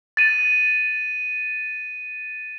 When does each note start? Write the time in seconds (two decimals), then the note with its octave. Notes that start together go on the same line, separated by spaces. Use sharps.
0.17 A6 D#7